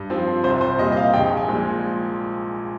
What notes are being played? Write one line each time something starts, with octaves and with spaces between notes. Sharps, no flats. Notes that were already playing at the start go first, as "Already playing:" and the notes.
Already playing: G2
F3 C4
C2 C5
C5
A#2 G3 D#5
D#5
F5
A#1 G5
G#5
A#2 F3 G#3